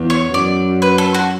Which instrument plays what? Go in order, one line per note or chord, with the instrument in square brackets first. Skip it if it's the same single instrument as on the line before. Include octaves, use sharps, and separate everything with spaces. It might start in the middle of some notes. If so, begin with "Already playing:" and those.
Already playing: [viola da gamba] E2
[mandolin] C#5
[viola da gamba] F#2 [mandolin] D5
[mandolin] B4
A4
F#4